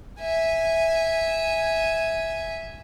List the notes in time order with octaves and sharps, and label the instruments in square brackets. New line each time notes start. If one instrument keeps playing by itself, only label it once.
[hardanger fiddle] E5 G#5